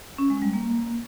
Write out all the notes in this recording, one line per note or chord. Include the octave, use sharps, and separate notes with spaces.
C#4
G#3
G3
A#3